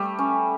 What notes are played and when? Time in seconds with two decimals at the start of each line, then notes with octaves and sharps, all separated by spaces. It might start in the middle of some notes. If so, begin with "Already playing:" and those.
Already playing: G3 A3 A4
0.19 C#4